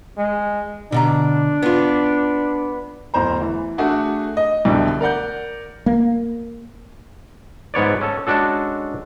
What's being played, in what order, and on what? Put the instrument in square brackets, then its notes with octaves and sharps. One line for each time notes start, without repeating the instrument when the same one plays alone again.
[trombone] G#3
[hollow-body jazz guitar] B2 D3 A#5 [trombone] D4
[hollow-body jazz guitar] B3 F4
[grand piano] D1 E2 C5 A#5
E3
A3 D4 F#4 G#4
D#5
C2 B2 D3 A3
A#4 D5 F#5 G6
[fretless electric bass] A#3
[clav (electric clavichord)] G#2 B3 C#5 D5
C#4 A4
G#3 C#4 D4 F#4 A4